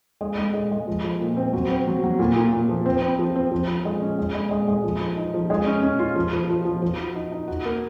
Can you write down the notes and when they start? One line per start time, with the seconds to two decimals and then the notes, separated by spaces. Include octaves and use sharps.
0.21 G#3
0.38 G#3
0.54 G#3
0.71 G#3
0.87 F3
1.04 F3
1.21 A#2
1.37 C4
1.53 F#3
1.70 C4
1.87 F#3
2.03 F#3
2.19 A#2
2.36 A#2
2.53 A#2
2.69 F3
2.86 C4
3.02 C4
3.19 F3
3.36 C4
3.51 F3
3.68 F3
3.85 G#3
4.02 C#4
4.18 G#3
4.34 G#3
4.51 G#3
4.68 G#3
4.84 F3
5.01 F3
5.17 D#4
5.34 F3
5.50 G#3
5.66 C#4
5.82 C#4
5.99 F4
6.16 F3
6.33 F3
6.50 F3
6.65 F3
6.82 F3
6.99 F#4
7.15 D#4
7.32 D#4
7.48 F#4
7.65 A#3